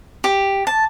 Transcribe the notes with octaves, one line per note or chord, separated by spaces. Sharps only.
G4
A5